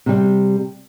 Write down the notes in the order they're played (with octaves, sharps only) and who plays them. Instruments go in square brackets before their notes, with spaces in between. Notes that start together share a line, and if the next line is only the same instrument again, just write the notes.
[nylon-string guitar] C3 G3